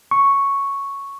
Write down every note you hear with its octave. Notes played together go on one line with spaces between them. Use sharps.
C#6